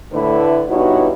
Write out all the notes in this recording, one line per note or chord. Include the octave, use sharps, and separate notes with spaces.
A2 D3 A3 E4 B4
G2 B2 D#4 E4 F#4 C#5